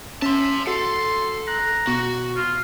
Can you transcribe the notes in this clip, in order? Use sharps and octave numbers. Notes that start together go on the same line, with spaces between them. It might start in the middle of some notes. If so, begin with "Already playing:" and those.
C#4 E5 A5 C6
F#4 A4 C6
A#5 F#6
B2 F#4
F4